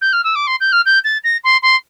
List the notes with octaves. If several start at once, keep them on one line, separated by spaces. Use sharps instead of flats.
G6
F6
E6
D6
C6
G6
F6
G6
A6
A#6
C6
C6